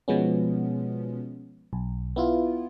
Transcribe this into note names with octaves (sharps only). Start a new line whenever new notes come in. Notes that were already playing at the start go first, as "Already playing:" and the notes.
B2 F3 G#3 B3 C#4
B1
B3 E4 F4